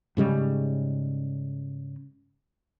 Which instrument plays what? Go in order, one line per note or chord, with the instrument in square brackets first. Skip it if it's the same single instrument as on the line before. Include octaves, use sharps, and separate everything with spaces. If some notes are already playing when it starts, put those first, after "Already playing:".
[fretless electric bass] G#2 C#3 G3 G#3